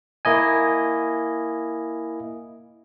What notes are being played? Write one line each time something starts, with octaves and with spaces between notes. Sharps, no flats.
A#3 E4 D#5 G#5